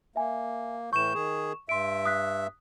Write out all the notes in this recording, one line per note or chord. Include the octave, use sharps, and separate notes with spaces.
A#3 E5 G#5
A2 E3 C#6 G6 E7
D#3 G#4
G2 E5 C6 D7
D#6 F#6 B6